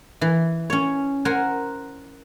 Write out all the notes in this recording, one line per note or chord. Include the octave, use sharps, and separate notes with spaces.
E3
C#4 C#5
A#4 C5 F#5 G#5